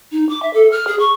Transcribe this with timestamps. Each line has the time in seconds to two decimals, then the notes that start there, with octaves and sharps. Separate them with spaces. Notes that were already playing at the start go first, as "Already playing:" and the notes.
0.12 D#4
0.29 D6
0.42 E5
0.54 A4
0.72 F6
0.87 G#4
1.00 C#6